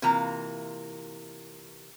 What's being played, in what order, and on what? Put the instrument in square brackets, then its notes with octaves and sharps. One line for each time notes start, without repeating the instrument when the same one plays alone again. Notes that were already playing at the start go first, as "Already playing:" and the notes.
[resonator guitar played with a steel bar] C3 E3 A#3 F4 A#5